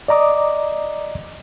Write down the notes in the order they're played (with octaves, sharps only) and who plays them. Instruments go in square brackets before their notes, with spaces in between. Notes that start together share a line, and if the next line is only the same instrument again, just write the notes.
[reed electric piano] D5 D#5 A#5 D6 D#6